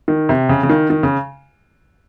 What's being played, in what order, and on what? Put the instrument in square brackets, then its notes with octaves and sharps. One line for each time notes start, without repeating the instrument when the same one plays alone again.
[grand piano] D#3
C3
C#3
C#3
D#3
D#3
C#3